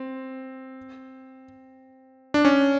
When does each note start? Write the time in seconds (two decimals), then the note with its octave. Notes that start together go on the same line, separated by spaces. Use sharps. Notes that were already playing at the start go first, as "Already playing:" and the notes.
Already playing: C4
2.34 D4
2.45 C#4